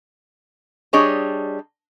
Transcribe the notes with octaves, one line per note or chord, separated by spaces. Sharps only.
G3 D4 G#4 C#5 D#5 G#5